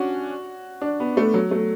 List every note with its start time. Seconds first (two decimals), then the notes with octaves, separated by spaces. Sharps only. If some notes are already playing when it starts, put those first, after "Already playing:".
Already playing: C#4 D4 F#4
0.82 D4
1.00 B3
1.17 A3
1.34 F#3
1.51 A3